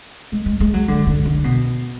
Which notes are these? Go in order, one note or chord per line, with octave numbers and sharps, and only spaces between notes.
G#3
G#3
G#3
F#3
D3
D3
D3
B2